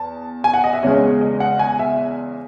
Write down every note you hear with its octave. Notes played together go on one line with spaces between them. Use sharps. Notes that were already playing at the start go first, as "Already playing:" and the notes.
Already playing: E2 A5
G#5
F#5
D#5
E5
E2 C#3 G#3 C#5
D#5
F#5
G#5
E5